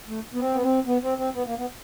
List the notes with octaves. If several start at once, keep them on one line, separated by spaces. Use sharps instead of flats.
A3
B3
C4
B3
C4
B3
C4
C4
B3
A#3
B3